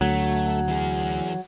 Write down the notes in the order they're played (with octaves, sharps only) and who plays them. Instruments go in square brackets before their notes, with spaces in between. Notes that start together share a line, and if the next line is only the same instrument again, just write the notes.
[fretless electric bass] D2 [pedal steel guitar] F#3 [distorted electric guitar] A3
[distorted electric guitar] E3 G#4